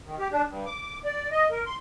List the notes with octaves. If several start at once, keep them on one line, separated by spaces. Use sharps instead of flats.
D#3
G4
D4
G2
D6
D5
D#5
A#4
C6